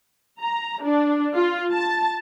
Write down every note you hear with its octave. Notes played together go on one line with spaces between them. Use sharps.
A#5
D4
F4
A5